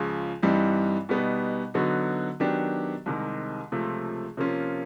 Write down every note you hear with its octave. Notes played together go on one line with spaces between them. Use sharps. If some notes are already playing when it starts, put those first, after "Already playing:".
Already playing: C#2 C#3 F3
G2 E3 G3 C4 D#4
B2 G3 B3 D#4
D3 F#3 B3 D#4 F#4
D#3 F#3 B3 D4 G4
C2 C3 D#3 G#3
C#2 C3 F3 A3
C3 F3 A#3 C#4 F4